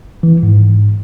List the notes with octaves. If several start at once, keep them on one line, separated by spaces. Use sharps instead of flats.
E3
G#2